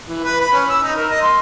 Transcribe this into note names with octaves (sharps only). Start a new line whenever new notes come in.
E3
B4
B5
C#4
E6
D#4
A#4
D#5
C6